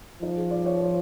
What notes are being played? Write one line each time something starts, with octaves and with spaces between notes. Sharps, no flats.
F3 D#4
G#4
D5
C#5
C5